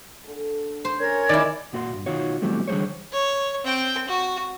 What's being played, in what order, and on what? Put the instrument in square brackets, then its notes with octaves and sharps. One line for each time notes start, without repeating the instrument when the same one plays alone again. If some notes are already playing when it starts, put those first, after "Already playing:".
[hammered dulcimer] D3 A4
[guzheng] C5
[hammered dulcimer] C#4 [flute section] A#4 C#5 G#6
[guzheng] D#3 E4 [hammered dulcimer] G#3 A#5 B5 [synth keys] D5
[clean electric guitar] F#2 A#2 F#4 D5 C6
G2
B1 D#3 D#4 F4 F#4 C#5
B2 E3 F#3 G3 A3 C4
D3 E3 G3 G#4 C5 C#5
[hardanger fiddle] C#5
C4 G5
F#4